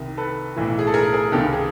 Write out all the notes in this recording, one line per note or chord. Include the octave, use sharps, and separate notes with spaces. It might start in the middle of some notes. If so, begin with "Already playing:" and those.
Already playing: C2 C3 D#3
A4 B4
B1 A2 E3
G#4
A4
G#4 A#4
G#4 A#4
C#2 C3 D#3 G4 A4
G#4